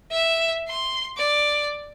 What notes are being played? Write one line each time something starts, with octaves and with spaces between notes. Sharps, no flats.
E5
C6
D5